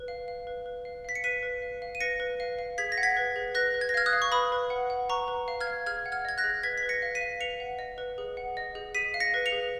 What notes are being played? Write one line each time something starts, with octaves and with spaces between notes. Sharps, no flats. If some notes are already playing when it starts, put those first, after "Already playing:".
Already playing: B4
F5
F5
B4
B4
F5
F5 B6
C#7
B4 B6 D#7
B4
F5
F5
D#7
B4 A#6 C#7
B4
F5
F5
G#4 G#6 B6
A#6
F#5
G#6 B6
B4
G#4
B4 F#6 A#6
B4
G#6
A#6
F5 F6 G#6
D#6 F#6
F5
C#6
B4 B5 D#6
B4
F#5
F#5
B4 A#5 C#6
B4
F5
F6 G#6
F5
G#4 F6 G#6
F#5
F6 G#6
D#5 G#6
F#6 A#6
G#4
B4 G#6 B6
B6
B4
A#6 C#7
F5
B6 D#7
F5
B4 C#7 F7
F#5
D#5
B4
G#4
F#5
D#5
G#4
G#4 B6 D#7
F5
A#6 C#7
B4
C#7 F7
G#4